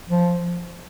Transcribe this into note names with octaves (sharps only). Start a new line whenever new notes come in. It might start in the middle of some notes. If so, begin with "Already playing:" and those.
F3